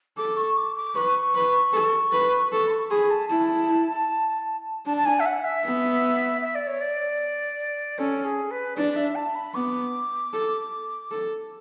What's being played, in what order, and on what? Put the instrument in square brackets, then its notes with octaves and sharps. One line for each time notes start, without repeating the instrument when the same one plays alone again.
[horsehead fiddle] A4 [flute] D6
[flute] C#6
D6
D6
[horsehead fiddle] B4 [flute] C#6
[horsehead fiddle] B4
A4
B4
[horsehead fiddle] A4 [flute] C#6
[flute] B5
C#6
[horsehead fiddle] G#4 [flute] B5
[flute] A5
[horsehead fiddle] E4 [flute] A5
[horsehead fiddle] D4 [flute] A5
[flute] A5
G#5
E5
F#5
E5
[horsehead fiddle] B3
[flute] E5
D5
C#5
D5
[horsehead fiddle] C#4 [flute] A4
[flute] G#4
B4
[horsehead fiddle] D4 [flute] D5
[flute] E5
A5
B5
[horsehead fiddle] B3 [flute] D6
[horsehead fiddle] A4
A4